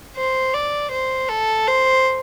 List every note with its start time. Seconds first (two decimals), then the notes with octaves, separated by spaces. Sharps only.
0.16 C5
0.53 D5
0.91 C5
1.29 A4
1.67 C5